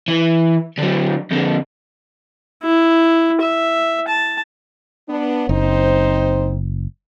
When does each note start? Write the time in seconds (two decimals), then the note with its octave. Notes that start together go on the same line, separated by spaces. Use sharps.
0.08 E3
0.78 D3 F#3
1.31 F2 D3
2.63 E4
3.42 E5
4.08 A5
5.09 B3 D4
5.49 F#1 C4 D#4 C5